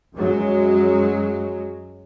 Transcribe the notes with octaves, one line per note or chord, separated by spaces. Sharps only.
F#2 F#3 G#3